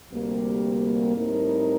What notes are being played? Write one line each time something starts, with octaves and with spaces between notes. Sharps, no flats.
D2 C3 G3 A#3
A2 G3 C4 D#4 A#4